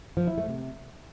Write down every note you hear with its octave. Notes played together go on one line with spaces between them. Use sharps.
F3
E4
A3
C3